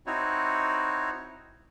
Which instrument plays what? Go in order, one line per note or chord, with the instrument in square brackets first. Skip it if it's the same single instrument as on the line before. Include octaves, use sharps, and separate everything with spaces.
[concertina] C4 D#4 E4 F#4 C#5